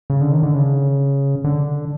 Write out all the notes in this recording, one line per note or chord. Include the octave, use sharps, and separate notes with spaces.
C#3
D3
D#3
D3
C#3
D3